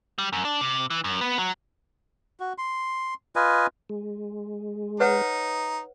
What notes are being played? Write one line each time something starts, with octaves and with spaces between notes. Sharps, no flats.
G3
F#2
D4
C3
E3
F#2
B3
F#3
F#4
C6
F4 B4 D#5 G#5
G#3
D#4 B4 C#5 F#5